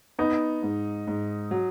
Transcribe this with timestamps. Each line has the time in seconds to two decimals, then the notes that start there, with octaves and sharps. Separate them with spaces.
0.19 B3 D#4
0.63 G#2
1.07 G#2
1.51 F#3